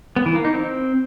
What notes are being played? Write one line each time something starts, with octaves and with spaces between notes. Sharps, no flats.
B3
E3
A#3
D#4
C4